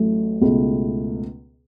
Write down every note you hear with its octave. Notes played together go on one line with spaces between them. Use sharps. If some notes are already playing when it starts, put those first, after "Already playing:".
Already playing: A1 A2 F#3 A3
C#2 B2 A3